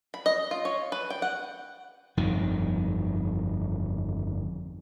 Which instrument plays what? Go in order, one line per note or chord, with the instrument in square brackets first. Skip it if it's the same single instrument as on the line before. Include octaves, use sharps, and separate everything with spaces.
[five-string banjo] B5
D#5
F4
C#5
B4
G5
F#5
[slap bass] G1 F2 D#3